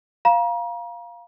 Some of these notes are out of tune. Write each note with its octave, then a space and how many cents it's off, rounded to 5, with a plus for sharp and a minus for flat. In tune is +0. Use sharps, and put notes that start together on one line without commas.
F5 +0 A#5 +35